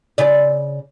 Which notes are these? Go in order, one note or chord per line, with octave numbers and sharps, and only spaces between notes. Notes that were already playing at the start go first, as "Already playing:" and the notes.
C#3 D5